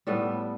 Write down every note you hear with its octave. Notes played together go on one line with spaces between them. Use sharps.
A2 G3 B3 A4